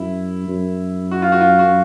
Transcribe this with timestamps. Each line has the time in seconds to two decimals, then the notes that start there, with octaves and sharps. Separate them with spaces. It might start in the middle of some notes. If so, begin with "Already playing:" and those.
Already playing: F#2 E4
0.48 F#2
1.11 F#4
1.22 F4
1.32 F#4
1.41 F4
1.59 F#4